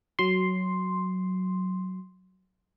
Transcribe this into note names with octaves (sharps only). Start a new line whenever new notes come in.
F#3 C6